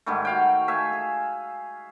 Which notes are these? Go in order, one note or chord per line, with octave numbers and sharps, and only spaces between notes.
G#2 D#3 G3 A3
F#4 F5 G5
A3 E5 F5 G#5
G#4